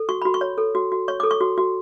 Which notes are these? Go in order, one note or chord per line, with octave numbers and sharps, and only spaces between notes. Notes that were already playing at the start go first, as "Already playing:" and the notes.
Already playing: A4
F#4 C#6
F#4 B5
C#6
C#5
A4
F#4
F#4
C#5 C#6
A4 D6
C#6
F#4
F#4